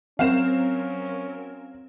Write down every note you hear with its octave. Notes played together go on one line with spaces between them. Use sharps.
F#3 C4 C#4 A#4 F5 E7